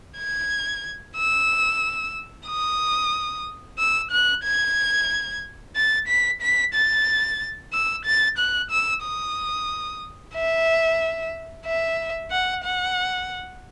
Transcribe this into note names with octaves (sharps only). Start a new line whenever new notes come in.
G#6
E6
D#6
E6
F#6
G#6
A6
B6
B6
A6
E6
A6
F#6
E6
D#6
E5
E5
F#5
F#5